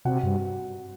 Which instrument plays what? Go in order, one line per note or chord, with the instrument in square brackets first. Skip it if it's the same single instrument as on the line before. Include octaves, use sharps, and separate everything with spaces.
[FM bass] C3 [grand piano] F#4 F#5
[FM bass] G2